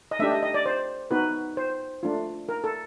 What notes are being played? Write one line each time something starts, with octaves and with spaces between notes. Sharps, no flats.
D#5
A3 D4 G4 E5
D#5
D#5
D5
C5
B3 D#4 F#4 B4
C5
A3 D4 F4
A#4
A4